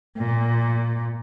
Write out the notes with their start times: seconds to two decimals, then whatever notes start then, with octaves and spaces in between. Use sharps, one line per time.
0.19 A#2